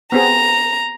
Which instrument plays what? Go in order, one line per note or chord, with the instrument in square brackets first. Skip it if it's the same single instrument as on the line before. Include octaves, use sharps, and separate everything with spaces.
[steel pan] B3 C4 G#4 [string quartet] A#5